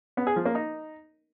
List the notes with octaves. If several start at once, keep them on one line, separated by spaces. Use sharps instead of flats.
B3
G#4
F3
A#3
D#4